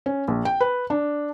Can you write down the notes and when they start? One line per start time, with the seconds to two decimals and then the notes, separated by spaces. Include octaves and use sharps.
0.06 C#4
0.28 A#1
0.45 G5
0.61 B4
0.90 D4